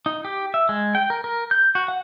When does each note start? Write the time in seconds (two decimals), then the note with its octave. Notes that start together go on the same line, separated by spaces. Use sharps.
0.06 D#4
0.25 G4
0.54 E5
0.69 G#3
0.95 G5
1.10 A#4
1.24 A#4
1.51 G6
1.75 F#4
1.88 F#5